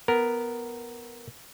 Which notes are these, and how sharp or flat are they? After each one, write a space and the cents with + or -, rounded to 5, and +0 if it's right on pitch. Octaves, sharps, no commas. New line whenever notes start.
B3 +0 A#4 +0